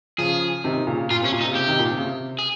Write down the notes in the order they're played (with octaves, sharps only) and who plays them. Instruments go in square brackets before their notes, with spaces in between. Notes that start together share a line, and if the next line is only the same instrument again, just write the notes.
[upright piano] C#3 F3 [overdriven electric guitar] G#4
[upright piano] C3 D#3
A#2 C#3
[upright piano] A#2 [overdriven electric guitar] F4
[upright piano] C3
[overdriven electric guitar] C#4
[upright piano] A#2
[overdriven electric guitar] D#4
[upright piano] C3
C#3
[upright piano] C3 [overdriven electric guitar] G4
[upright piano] C3 D#3
A#2
C3
C#3
C3
[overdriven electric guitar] G#4